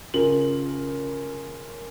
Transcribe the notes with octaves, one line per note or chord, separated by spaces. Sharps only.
C#3 F4 A#4 F#7